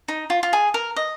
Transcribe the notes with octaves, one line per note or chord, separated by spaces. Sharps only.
D#4
F4
F4
G#4
A#4
D#5